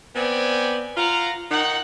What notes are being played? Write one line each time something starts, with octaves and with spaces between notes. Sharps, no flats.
B3 C4 D5 G5 G#5
F4 F5 F#5 A#5
D#3 D#4 F#5